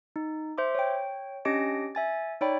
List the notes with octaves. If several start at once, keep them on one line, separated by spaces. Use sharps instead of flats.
D#4
C5 E5 C6 D6
C#5 G5
C#4 D4 G4 D#5 A#6 D7
E5 G#5 A6
D#4 C#5 D5 G5 B5